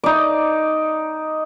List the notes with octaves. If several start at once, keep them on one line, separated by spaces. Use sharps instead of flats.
D#4 D5